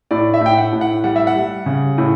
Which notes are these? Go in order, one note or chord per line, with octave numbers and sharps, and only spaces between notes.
A2 D5
E5
A2 G5
F#5
A2
F#5
G3 F#5
E5
F#5
G3
C#3
A2